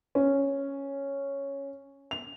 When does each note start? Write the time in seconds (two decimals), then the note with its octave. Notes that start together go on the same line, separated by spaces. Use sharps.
0.15 C#4
2.11 F7